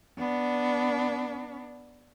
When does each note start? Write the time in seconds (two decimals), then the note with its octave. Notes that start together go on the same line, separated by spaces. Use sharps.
0.18 B3 D4